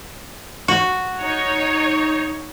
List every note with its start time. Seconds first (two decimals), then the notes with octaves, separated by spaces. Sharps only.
0.68 F#4
1.18 D#4 C#5